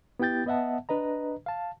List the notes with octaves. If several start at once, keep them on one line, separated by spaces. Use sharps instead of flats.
B3 E4 G4 G5 G6 A6
B3 D#5 E5 F#5 A5
D4 B4 D#5 A#5
F5 A5